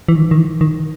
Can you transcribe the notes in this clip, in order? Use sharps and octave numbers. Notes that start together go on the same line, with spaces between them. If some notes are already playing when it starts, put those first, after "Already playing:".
E3
D#3
D#3
E3
D#3